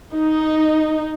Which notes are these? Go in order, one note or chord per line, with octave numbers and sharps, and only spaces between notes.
D#4